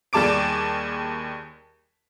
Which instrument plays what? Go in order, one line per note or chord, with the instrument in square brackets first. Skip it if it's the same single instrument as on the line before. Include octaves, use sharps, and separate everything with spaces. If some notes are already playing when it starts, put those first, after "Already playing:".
[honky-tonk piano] D#2 G3 G#4 A5 D6 D7